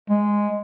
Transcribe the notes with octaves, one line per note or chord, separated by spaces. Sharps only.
G#3